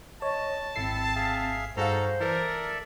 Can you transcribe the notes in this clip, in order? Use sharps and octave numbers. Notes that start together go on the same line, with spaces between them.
C#5 D#5 A5
G#1 C4 E4 A4 C7
G#4 E5 F5
G2 D#4 F#4 G#4 A4 C5 F5 A#5
E3 A4 A#4 D5 E5